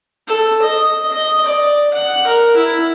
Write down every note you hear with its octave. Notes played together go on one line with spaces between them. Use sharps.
A4
D#5
D#5
D5
F#5
A#4
E4